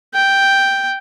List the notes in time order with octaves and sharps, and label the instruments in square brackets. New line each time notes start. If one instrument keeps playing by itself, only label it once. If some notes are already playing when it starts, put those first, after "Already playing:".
[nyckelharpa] G5